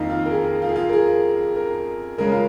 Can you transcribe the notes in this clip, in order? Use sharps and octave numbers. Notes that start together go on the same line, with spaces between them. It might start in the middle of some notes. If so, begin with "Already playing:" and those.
Already playing: F2 D#3 A#3 D#4 F5
F4
A#4
G#4
F4
G#4
F4
A#4
G#4
A#4
C#3 G#3 C#4 A#4
F4